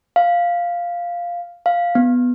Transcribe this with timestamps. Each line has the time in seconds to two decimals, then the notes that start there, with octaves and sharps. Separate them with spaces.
0.16 F5
1.66 F5
1.95 B3